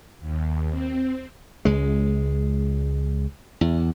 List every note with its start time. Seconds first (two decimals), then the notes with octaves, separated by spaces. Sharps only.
0.20 D#2
0.70 C4
1.65 C#2 G#3
3.61 E2